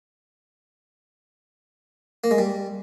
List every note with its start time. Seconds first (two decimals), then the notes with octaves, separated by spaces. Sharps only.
2.24 A#3
2.31 G#3
2.38 G3